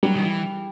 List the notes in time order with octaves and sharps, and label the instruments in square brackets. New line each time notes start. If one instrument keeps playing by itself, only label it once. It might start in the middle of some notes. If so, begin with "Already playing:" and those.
[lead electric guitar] F#3 [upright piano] G3
[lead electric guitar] D#3
E3